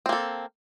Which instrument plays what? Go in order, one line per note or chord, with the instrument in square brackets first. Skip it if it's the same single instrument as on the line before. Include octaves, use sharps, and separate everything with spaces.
[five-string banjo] C4
A#3
A4